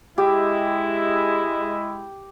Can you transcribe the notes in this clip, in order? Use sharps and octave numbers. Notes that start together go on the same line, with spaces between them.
G#3 E4 G4